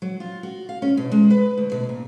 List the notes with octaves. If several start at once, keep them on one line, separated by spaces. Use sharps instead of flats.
F#3
F4
F#4
F5
C#4
B2
G#3
B4
D2
B2
A#2